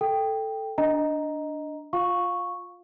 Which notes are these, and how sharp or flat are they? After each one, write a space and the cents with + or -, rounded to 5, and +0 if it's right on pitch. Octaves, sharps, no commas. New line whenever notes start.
A4 +0 G5 +5
D4 +0 D#5 +0 A#5 +5
F4 +10 F5 +20 C#6 -5